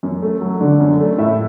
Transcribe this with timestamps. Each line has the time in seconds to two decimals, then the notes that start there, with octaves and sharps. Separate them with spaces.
0.03 F#2
0.22 A3
0.41 F#3
0.61 D3
0.80 F#2
1.00 A3
1.18 A2 E5